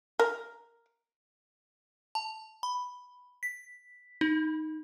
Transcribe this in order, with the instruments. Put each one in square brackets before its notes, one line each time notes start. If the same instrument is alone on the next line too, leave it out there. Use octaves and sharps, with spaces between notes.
[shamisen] A#4
[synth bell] A5
B5
B6
D#4